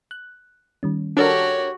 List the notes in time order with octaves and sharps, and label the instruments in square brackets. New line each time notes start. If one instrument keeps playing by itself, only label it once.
[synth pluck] F#6
D#3 G3 C#4
[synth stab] D4 A4 A#4 [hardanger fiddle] F#4 G4 [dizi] C#5